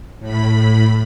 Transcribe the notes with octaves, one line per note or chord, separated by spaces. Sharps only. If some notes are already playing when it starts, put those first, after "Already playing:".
A2 B5